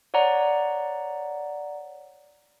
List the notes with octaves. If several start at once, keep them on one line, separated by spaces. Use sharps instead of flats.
C#5 D5 F#5 A#5